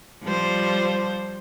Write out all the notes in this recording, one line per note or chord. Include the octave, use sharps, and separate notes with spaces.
F3 G3 C5